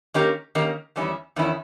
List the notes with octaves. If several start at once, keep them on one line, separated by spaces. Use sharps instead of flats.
D#3 A#3 C#4 G4 A#4
D#3 A#3 C#4 G4 A#4
E2 D#3 G3 C#4 E4
E2 D#3 C#4 E4